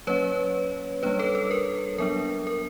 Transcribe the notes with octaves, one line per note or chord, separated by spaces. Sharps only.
F#3 A#3 C#4 B4 C#5
G3 A#3 D4 B4 C#5
A4 B4
A4
A#4
F#3 B3 D4 A#4
A#4